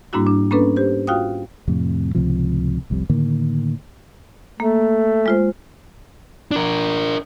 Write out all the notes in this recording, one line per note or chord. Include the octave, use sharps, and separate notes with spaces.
G#2 G3 A#3 D4 E4 F#4
D4
A#3 B3 C#4 D4 A4 B4
G4 C5
F4 F#4 F5 G5 D#6
F2 A2 C3
C#2 A2 C3 F3
F1 C2 F2 C3
A2 D3 D#3 A#3
A3 A#3
G#3 F4 C5
D4 A#4